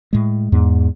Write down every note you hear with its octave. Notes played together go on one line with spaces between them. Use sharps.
A2 G#3
E2 G#2